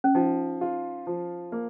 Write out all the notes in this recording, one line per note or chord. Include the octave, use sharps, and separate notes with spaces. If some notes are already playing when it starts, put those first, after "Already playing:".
C#4
F3 D#4
F4
F3
A#3